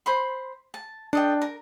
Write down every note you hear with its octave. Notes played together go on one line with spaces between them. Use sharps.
C5 B5 C6
A5
D4 A4 D#5 G5
A#4